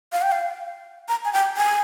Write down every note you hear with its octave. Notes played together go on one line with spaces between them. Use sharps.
F5
G5
F5
A#5
G#5
G5
G#5